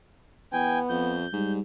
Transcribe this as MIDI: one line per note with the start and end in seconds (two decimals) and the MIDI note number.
0.53 0.81 40
0.53 1.22 59
0.53 0.79 79
0.53 0.79 80
0.89 1.26 41
0.89 1.52 91
1.33 1.60 44
1.33 1.60 55